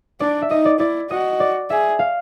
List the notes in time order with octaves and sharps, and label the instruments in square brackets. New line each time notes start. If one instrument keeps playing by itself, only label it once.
[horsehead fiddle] D4 [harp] D5
[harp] E5
[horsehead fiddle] D#4 [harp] D#5
[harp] D5
[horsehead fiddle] E4 [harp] D5
[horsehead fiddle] F#4 [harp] D#5
[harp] D5
[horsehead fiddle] G#4 [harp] E5
[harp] F5